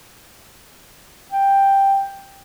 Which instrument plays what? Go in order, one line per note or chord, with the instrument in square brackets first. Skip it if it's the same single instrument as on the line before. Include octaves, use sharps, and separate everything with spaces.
[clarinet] G5